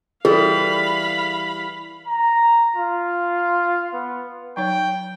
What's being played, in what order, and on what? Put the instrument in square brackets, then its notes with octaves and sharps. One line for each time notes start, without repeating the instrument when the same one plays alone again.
[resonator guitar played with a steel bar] E3 G3 [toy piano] G#4 A4 [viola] F5 B5
[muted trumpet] A#5
F4
B3
[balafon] F#3 D#4 C#5 [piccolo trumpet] G5